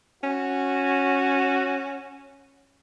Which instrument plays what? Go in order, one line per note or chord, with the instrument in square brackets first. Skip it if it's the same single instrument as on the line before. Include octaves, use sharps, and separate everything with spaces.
[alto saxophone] C#4 [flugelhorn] F#4